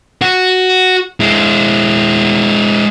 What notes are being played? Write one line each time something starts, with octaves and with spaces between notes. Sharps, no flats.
F#4
G#3 E4